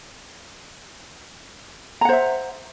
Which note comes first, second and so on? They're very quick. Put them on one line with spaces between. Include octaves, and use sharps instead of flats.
A#5 F#5 C5 E5